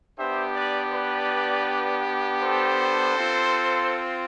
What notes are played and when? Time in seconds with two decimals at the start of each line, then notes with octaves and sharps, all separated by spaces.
0.19 B3 D4 G4 C5 E5
0.56 B4 D5
0.94 B4 D5
2.43 A4 C5
3.17 C4 F4